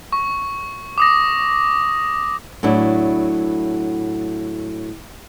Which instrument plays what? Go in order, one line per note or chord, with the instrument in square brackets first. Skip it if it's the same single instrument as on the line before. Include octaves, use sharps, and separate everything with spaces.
[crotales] C#6
D6 D#6 A#6
[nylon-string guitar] A2 F#3 D4 E4